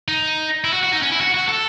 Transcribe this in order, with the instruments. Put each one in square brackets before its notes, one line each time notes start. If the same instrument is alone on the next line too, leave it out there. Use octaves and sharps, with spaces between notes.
[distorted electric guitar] D#4
E4
F#4
F#4
D#4
C#4
E4
F#4
F#4
A4